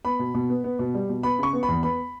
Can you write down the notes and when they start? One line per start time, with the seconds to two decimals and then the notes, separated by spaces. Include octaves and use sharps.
0.05 B3 B5
0.19 B2
0.34 B2
0.50 B3
0.64 B3
0.79 B2
0.94 G3
1.09 B2
1.23 B3 B5
1.39 C#3 C#6
1.53 B3
1.63 B5
1.69 E2
1.83 B3 B5